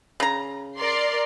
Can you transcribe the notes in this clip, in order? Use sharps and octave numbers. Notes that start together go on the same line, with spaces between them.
C#3 A#5
A#4 D5 C6